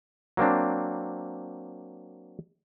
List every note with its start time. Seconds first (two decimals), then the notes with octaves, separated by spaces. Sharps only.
0.37 F#3 A#3 C4 D4